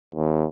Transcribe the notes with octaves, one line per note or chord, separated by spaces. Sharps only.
D#2